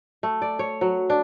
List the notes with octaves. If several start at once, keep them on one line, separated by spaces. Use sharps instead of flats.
A3
D5
C#5
F#3
D4